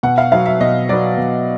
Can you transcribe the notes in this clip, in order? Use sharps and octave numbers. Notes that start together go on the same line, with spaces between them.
B2 F#5
F5
F#3 B3 F5
E5
B2 D#5
F#3 B3 D5
B2